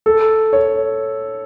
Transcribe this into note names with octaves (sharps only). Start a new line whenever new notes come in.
A4
C#5